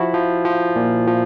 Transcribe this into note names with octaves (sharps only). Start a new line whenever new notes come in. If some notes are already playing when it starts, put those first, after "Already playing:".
Already playing: F3 E4 F#4
F3
F3
A#2
F3